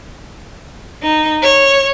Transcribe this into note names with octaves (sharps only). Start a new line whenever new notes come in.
D#4
C#5